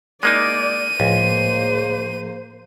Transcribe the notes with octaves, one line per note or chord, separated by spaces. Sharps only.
G#3 A#3 D#4 D5 D#7
C#2 A2 F3 A#3 G#4 C5